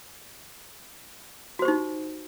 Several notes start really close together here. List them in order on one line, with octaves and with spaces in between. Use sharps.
F#4 C5 G4 D#4